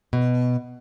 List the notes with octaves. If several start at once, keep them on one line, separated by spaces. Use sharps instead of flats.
B2